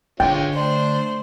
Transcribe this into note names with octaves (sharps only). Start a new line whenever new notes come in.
D3 G#3 C#4 F4 G5
A3 D4 C5